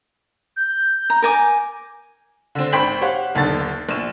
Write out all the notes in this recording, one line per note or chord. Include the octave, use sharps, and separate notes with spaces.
G6
A#5
A#4 G#5 D6
D3 C4
G#1 C5 G5 B5 B6 F#7
G4 C5 C#5 F5 F#5
D#1 B1 D3 D#3 A5 A6
A#1 E7